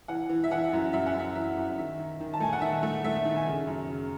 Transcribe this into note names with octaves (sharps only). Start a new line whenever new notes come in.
E3 F#5
E3
E5
E3 F#5
F#2
F#2 E5
F#5
F#2
E5
E3 E5
F#2
D#3 E5
D#3
D#3
A5
A3 G#5
F#5
D#3 E5
A3
A3 E5
E5
D#3
G#5
C#3
F#2
C#3